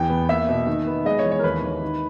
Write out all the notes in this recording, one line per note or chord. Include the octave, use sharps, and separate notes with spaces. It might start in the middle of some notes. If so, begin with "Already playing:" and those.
Already playing: E2 G5
B3
A#3 E5
B2
D#3
B3
G#3 D#5
C#5
E3
C#5
A#4
D#2 B4
D#2
D#3